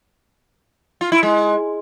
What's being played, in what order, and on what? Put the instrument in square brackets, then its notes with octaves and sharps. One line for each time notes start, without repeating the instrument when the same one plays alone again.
[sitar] F4
E4
G#3